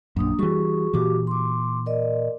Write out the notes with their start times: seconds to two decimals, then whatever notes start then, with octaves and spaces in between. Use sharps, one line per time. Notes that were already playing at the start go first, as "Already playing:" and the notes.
0.16 A#1 F#2 A#3 D4 D#6
0.39 E3 G3 F#4 G#4 C#6
0.93 A#2 E3 F#4 G4 D6
1.27 C6 D6
1.86 A#4 D5 D#5